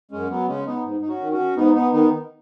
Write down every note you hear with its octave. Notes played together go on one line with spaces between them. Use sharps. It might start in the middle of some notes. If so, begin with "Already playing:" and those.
F#2 G#3 C#4
F#3 B3
C#3 G#3 C#4
B3 D#4
G#2
D#4
C#4 F#4
D#3
C#4 F#4
G#2 B3 D#4
B3 D#4
D#3 B3 D#4